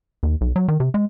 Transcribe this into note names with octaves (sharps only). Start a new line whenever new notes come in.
D#2
B1
F#3
D#3
C3
G#3